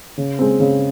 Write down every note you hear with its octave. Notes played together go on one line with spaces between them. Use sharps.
C#3
G#3 C4
C#3